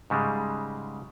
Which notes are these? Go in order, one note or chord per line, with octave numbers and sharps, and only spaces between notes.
G#2 C#3 G3 G#3